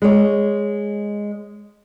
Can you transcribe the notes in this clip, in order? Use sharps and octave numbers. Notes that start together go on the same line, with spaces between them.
G#3 C#5